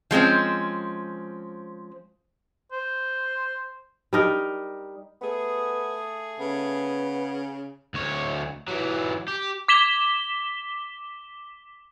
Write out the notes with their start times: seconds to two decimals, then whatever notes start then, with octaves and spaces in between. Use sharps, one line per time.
0.11 F3 G#3 C4 C#4
2.72 C5
4.13 G3 D#4 A#4
5.22 A3 B3 G#4
6.40 C#3 B3
7.94 D2 C#5
8.68 E3 F#3
9.28 G4
9.68 D6 B6 E7 G7